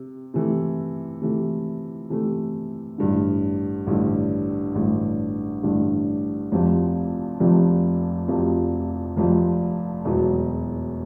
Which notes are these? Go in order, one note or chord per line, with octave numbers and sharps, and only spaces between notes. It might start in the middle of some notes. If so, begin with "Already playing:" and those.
Already playing: C3
C3 E3 A3
C3 E3 A3
C3 E3 A3
A1 G2 D3
A1 G2 D3
A1 G2 D3
A1 G2 D3
F1 F2 C3 F3
F1 F2 C3 F3
F1 F2 C3 F3
F1 F2 C3 F3
E1 E2 B2 F#3 B3